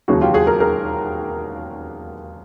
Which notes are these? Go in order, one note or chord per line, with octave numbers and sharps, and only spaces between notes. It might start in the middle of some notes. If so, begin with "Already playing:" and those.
E1 D#2 C#3 F#3 F#4 G#4
F4 G4
F#4 G#4
G#4 A#4
G#4 A#4